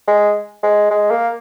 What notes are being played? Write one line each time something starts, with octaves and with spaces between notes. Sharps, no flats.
G#3
G#3
G#3
A#3